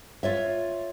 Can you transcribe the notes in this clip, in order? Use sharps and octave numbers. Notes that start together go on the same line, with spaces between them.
F4 C#5 E5